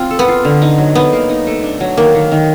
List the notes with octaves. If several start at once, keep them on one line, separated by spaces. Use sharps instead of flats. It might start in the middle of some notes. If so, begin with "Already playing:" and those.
Already playing: C4 F4
A4
B3
F4
D3
D#4
F#3
B3 D#4
A#3
D#4
A3
D4
F#3
D#3 A#3
D#3
D#3